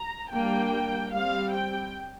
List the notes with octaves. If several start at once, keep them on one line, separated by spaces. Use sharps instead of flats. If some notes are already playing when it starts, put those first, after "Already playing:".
Already playing: A#5
G3 A#3 D4 G5
G3 C4 F5
G5